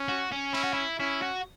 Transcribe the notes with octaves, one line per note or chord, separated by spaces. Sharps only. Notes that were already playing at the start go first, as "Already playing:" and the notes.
Already playing: C#4
F#4
C#4
C#4 E4
F#4
E4
C#4 E4
F#4